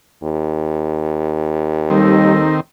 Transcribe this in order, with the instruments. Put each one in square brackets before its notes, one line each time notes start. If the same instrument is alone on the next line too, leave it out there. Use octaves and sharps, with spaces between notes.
[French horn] D#2
[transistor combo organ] D#3 C4 [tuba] G3 [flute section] D#4 A4 D#5